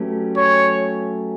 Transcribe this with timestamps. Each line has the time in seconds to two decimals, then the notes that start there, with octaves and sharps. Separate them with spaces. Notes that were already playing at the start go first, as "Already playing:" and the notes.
Already playing: F#3 A3 C#4 G4 B4
0.37 C#5